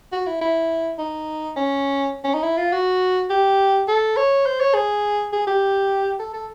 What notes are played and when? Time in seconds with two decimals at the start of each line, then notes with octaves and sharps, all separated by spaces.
0.12 F#4
0.27 E4
0.41 E4
0.99 D#4
1.56 C#4
2.24 C#4
2.34 D#4
2.44 E4
2.58 F4
2.72 F#4
3.30 G4
3.88 A4
4.17 C#5
4.46 C5
4.60 C#5
4.75 G#4
5.33 G#4
5.47 G4
6.19 A4
6.34 A4